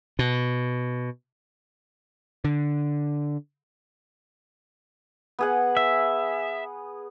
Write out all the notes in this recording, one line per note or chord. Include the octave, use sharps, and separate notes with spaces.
B2
D3
B3 G#4 F#5
E5